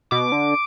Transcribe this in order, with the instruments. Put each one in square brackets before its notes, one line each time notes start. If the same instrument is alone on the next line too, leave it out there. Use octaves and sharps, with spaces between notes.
[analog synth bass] B2 [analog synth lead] D6
[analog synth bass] D3